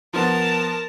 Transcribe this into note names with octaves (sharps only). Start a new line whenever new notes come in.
F3 B3 A#4 A5